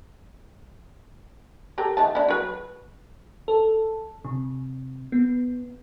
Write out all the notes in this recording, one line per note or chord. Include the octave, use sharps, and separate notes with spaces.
G4 A4 A#4
D#3 E3 A5
D4 E4
F#3 B4
A4
C3
B3